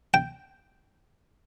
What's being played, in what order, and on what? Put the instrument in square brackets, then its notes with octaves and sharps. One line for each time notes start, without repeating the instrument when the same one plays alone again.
[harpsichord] G5